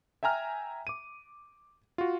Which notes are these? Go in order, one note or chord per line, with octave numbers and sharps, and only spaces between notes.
E5 G5 G#5 A#5 F6
D6 D#7
F4 F#4